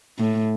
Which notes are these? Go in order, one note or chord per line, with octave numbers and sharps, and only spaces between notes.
A2